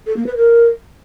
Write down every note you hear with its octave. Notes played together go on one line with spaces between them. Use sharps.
A4
A#3
B4
A#4